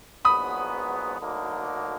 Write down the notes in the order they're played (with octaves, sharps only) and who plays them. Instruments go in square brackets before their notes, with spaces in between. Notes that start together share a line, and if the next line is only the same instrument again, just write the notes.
[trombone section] A#1 G#2 F#3 B3 [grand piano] B5 D#6
[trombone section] D2 D3 F#3 A#3 D#4